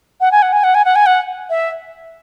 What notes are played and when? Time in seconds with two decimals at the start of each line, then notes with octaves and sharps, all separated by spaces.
0.21 F#5
0.32 G#5
0.42 F#5
0.53 G#5
0.64 F#5
0.75 G#5
0.85 F#5
0.96 G#5
1.06 F#5
1.50 E5